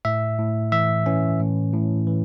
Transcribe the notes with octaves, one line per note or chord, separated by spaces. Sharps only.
A2 E5
A2
E3 E5
E3 C#4
A2
A2
E3